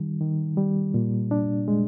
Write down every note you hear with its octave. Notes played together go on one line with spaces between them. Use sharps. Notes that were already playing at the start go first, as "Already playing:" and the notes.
Already playing: D#3 G3
D#3
G3
A#2
D4
G#3